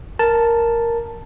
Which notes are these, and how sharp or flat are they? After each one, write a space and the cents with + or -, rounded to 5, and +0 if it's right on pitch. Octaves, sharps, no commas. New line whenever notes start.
A#4 +0 A5 +0